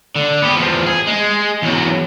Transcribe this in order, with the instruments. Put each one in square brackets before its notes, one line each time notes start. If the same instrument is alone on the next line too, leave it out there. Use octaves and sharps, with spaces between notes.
[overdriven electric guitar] D3
B3 G4
E2 F3
G#4
G#3
E2 F#3